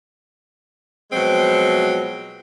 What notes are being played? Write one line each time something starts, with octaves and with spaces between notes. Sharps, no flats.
B2 F3 F#3 G#3 C4